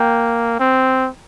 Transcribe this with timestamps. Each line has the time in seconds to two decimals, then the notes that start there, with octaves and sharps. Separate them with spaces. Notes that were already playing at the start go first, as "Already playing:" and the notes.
Already playing: A#3 G5 A#5
0.60 C4